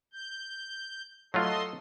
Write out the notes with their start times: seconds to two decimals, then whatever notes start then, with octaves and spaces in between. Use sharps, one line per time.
0.13 G6
1.34 F#3 A3 F4 A4 D#5 C6